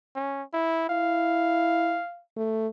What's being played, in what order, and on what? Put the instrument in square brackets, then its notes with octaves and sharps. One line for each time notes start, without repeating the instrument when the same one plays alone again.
[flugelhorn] C#4
E4
[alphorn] E4 [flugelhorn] F5
[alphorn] A3